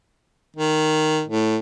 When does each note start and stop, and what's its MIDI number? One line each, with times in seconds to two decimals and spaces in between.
0.56 1.23 51
1.28 1.58 45